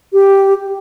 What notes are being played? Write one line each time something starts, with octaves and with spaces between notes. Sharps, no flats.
G4